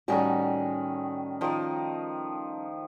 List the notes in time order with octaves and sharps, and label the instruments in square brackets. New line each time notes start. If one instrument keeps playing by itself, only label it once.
[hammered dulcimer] A2 D#3 A3 [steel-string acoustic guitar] G3 C#4 F#4
[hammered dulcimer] D#3 F3